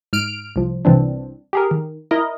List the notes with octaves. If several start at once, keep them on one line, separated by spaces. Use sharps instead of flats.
G#2 F6 D7
C2 F3
C2 E3 C4 D4
G4 G#4 A#4
D#3
E4 A#4 D#5